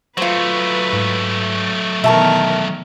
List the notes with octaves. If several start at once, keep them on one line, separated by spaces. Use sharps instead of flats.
F#3 A3 F4 B4 C5
G#2
E2 B2 D#3 A#4 E5 A5 C#6